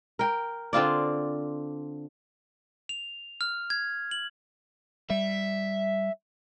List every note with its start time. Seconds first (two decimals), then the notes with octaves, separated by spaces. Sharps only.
0.19 A#4 G5
0.73 D3 C4 F4 D5
2.89 F7
3.41 F6
3.70 G#6
4.11 F#7
5.10 G3 E5